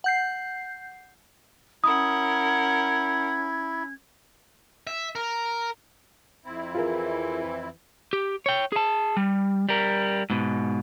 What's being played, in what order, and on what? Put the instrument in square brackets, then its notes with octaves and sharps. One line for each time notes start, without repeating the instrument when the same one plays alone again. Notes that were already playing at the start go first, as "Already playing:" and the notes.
[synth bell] F#5 G6 C7
[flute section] C#4 G#6 [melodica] E4 [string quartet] A#4 F#5 [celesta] D#6
[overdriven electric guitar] E5
A#4
[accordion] F2 C4 E4
[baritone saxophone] E3 [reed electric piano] F4 G#4 A#4
[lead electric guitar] G4
C#5 G5
G#4 A5
G3
G3 A#4
G#2 B2